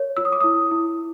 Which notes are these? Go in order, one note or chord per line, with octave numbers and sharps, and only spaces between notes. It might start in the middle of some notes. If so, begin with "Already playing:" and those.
Already playing: A#4 C#5
F4 E6
D#6
D6
E4 D#6
E4